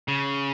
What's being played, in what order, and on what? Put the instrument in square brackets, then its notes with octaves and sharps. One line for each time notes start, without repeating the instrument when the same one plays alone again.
[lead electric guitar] C#3